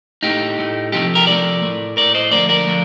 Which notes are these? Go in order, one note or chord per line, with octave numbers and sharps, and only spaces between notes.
A2 A3 D#4 G4
A2 A3
C3 F3 A3 D#4 G4
G4 A#4
C3 F3 A3 A#4 D5
A2 A3
A2 A3 A#4 D5
C5 D#5
D3 F3 A3 A#4 D5
A#4 D5
D3 F3 A3